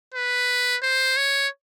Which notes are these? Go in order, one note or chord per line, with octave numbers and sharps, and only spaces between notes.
B4
C5
C#5